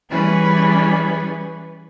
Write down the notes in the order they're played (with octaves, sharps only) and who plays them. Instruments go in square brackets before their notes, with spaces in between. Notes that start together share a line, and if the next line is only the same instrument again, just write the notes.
[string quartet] E3 G3 C#4 G#4 B4